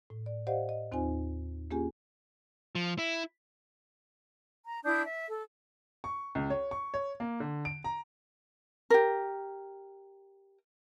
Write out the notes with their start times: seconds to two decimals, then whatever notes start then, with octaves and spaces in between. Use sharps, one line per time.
0.10 A2
0.26 D5
0.47 G4 C5 D5 D#5 F5 F#5
0.69 D#5
0.92 D#2 C4 D#4 F4 C5 G#5
1.71 A#3 C#4 F4 G4 G#4 G#5
2.75 F3
2.99 E4
4.65 A#5
4.84 D4 E4 D#6 G6
5.03 E5
5.28 A4
6.04 C#6
6.35 C#2
6.50 C#5
6.71 C#6
6.94 C#5
7.20 A#3
7.40 D3
7.65 D7
7.84 A#5
8.90 G4 A#4